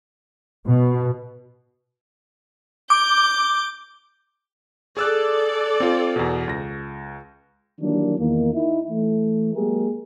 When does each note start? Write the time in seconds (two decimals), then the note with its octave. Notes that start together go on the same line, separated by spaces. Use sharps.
0.66 B2
2.90 D6 G6
4.97 G#4 A4 D5 E6 F#6
5.80 C4 F4
6.16 E2 B2
6.48 C#2 A#6
7.80 D#3 E3 F#3 G3 A#3 D4
8.19 E2 D#3 A#3
8.54 D#4 E4
8.89 E3 A3
9.54 F#3 G#3 A#3 G4 G#4 A#4